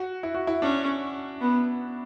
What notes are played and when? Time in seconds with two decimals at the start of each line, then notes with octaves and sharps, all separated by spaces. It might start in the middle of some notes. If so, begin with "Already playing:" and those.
Already playing: F#4
0.23 E4
0.34 F#4
0.47 E4
0.62 C#4 D4
1.41 B3